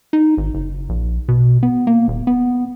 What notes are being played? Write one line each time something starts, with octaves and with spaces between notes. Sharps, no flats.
D#4
G#1
F#1
A#1
B2
B3
A#3
D#1
B3